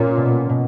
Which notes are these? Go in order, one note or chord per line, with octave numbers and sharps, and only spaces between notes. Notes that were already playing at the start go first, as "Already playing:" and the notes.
Already playing: A#2 C#4
B2
B2